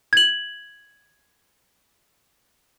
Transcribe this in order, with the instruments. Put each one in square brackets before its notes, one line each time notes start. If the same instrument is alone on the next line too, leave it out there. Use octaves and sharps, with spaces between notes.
[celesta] G#6 F#7